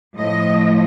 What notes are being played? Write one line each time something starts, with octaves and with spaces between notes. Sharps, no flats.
A2 F3 D#5